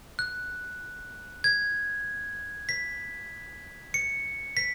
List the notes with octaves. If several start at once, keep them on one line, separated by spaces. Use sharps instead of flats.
F#6
G#6
B6
C#7
B6